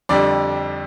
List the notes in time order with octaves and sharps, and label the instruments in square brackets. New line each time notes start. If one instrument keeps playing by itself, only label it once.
[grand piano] F2 D3 G3 D5